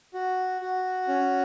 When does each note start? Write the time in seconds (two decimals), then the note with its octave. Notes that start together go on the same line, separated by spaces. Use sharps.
0.14 F#4
0.61 F#4
1.08 C#4